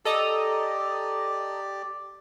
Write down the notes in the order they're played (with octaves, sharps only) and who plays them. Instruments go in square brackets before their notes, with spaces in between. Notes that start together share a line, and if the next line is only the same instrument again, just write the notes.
[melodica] G4 D5 [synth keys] A4 D#5 A#5